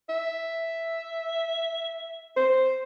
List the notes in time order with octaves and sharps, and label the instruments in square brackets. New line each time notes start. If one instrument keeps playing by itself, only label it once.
[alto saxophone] E5
C5